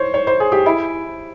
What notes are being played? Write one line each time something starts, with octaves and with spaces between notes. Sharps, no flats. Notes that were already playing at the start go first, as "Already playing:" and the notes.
Already playing: C5 C#5
C#5
C5
G#4
G4
E4